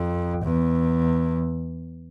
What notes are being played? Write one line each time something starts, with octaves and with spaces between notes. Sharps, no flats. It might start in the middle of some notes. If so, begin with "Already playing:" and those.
Already playing: F2
E2